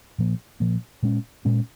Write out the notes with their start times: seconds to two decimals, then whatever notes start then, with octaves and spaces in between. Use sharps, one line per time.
0.18 A#2 F3 A#3
0.60 A#2 F3 A#3
1.03 A#2 G#3 C#4
1.45 A#2 G#3 C#4